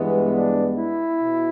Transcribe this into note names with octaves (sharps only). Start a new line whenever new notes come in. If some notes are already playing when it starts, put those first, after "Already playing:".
Already playing: G2 E3 G#3 B3
D4
E4
B2